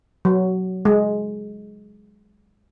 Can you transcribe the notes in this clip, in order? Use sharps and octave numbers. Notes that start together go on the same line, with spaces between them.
F#3
G#3